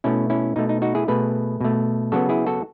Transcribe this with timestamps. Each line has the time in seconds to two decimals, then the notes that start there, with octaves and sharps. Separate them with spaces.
0.04 B2 A3 C#4 E4
0.30 C#4 E4
0.56 B2 A3 D#4
0.69 D#4
0.82 D#4 F#4
0.95 E4 G#4
1.08 B2 A3 G#4 B4
1.61 B2 A3
2.12 C#3 F#3 B3 F#4 A4
2.29 E4 G#4
2.46 F#4 A4